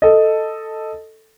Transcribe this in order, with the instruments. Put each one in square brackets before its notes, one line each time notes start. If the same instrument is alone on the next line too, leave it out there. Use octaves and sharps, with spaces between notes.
[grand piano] A4 D#5